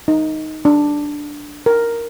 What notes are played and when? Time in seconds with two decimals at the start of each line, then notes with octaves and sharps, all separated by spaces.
0.08 D#4
0.65 D4
1.66 A#4